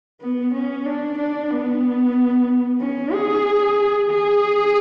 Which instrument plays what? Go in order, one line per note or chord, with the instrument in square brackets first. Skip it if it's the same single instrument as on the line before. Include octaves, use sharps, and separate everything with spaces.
[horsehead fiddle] B3
C#4
D4
D4
B3
C#4
G#4
G#4